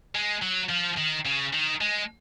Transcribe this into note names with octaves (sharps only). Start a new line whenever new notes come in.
G#3
F#3
F3
D#3
C#3
D#3
G#3